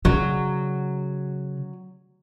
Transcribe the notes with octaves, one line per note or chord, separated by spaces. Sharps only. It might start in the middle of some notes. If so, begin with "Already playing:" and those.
C#3 F#3